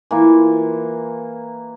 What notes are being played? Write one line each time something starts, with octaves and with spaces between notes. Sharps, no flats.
E3 A#3 F4